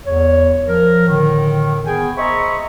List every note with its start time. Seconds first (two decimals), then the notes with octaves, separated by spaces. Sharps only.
0.06 E2 C#5
0.67 F3 A#4
1.07 A2 D3 D#3
1.85 B3 G#4 G5 G#5
2.17 C5 D#5 E5 A#5 B5 C#6